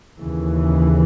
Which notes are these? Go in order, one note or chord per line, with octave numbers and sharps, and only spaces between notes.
D#2 C#3 E3